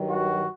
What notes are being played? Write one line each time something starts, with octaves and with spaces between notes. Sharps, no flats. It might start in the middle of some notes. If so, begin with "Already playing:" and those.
Already playing: G2 D#3 F#3
F#4